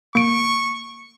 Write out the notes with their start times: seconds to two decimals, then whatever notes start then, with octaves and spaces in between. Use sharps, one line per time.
0.15 A#3 C#6 D7